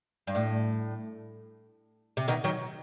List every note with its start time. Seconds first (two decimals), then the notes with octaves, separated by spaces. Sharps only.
0.27 G2
0.35 A2
2.17 C3
2.28 B2 D#3
2.44 D#3 F#3